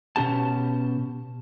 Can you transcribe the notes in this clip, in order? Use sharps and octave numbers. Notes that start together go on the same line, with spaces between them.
B2 C#4 G4 A5